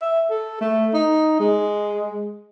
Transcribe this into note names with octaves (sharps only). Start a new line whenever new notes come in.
E5
A4
A3
D#4
G#3